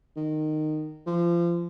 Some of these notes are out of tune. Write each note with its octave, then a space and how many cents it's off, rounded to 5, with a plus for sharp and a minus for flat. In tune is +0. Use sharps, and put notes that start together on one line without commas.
D#3 -15
F3 -30